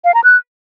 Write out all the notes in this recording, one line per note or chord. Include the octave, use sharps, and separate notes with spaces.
F5
A#5
F#6